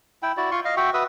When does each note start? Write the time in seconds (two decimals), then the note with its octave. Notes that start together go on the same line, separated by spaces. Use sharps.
0.22 E4 G5
0.37 E4 F#4 D5
0.51 F4 C6 C#6
0.65 D#5 F5
0.77 F#4 E5 G5 C#6
0.94 F#4 B4 E5 D#6